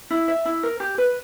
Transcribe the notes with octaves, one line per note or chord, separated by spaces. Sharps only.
E4
E5
E4
A#4
G4
B4